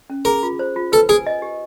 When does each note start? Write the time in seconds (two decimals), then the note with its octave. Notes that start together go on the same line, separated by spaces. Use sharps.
0.10 C#4
0.25 G#4 A#4
0.43 F4
0.59 C5
0.76 F4
0.92 A4 B4
1.09 G#4 G#5
1.27 D#5
1.42 G4